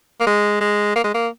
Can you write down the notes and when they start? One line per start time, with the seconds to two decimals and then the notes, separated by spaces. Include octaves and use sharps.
0.20 A#3
0.27 G#3
0.61 G#3
0.96 A#3
1.04 G#3
1.14 A#3